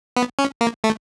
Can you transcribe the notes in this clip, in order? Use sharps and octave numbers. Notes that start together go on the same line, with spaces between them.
B3
C#4
A#3
A3